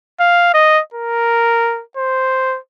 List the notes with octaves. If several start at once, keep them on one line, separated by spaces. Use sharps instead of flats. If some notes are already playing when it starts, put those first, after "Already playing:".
F5
D#5
A#4
C5